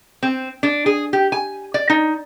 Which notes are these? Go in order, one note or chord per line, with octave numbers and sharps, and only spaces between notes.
C4
D4
G#4
G4
G#5
D5
D#4